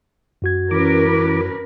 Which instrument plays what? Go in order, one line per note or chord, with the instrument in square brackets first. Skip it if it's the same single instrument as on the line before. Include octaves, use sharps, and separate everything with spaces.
[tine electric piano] F#2 F#4 G#6
[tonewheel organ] E3 D6 [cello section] C#4 A#4 B4